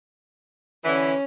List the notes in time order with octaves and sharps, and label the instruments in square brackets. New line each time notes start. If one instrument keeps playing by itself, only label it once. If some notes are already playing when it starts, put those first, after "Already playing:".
[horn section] D3 E3 [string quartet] C#4